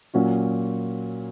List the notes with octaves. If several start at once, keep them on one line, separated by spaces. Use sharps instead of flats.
A#2 F#3 A#3 C#4 F#4